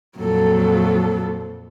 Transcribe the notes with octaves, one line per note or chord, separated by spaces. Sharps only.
F2 A#2 F#3 A4